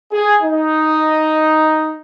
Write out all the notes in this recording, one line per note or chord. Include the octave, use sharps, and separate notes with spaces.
G#4
D#4